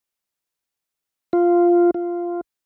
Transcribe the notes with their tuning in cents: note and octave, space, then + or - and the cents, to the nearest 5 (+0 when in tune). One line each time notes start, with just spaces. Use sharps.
F4 -5
F4 -5